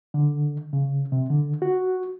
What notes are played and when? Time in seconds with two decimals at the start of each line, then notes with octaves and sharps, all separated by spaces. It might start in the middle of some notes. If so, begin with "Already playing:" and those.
0.14 D3
0.73 C#3
1.12 C3
1.30 D3
1.62 F#4